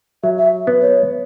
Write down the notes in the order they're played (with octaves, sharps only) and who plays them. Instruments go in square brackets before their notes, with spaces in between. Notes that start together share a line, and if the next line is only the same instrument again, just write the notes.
[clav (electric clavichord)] F#3 [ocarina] E5
[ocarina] E5
[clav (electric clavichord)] B3
[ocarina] C#5